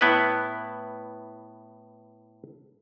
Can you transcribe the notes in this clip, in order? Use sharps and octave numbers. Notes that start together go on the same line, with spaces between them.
A2 B3 E4 B4